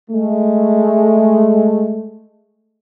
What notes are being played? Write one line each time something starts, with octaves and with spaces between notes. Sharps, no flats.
G#3 A3